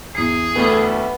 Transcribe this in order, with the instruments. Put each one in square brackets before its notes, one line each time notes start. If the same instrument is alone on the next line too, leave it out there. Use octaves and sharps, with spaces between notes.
[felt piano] E2 C7 [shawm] G#4
[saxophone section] D2 G3 A3 [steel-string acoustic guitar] B3